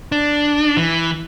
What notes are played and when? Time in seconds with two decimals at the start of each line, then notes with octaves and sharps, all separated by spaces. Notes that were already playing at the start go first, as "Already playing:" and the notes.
0.12 D4
0.77 E3